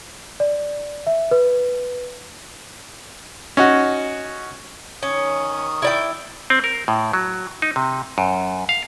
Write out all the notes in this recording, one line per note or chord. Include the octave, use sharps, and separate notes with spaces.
D5
E5
B4
C#4 D#4 F#4
D#3 C#4 C#5 D#6
E4 D5 G5
C4
A#4
A2
F#3
D#4
C3
F#2
F5